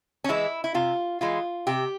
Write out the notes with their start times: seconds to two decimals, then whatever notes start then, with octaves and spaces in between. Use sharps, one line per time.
0.24 C#4
0.29 E3 G#3 E4
0.64 E4
0.74 C3 F4
1.21 E3 G#3 F4
1.67 C3 G4